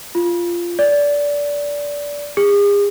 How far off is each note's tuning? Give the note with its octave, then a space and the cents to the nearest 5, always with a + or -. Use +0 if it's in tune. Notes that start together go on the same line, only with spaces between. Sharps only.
F4 -10
D5 -20
G#4 -40